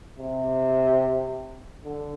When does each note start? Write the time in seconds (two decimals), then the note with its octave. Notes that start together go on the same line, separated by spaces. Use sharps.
0.19 C3
1.84 D3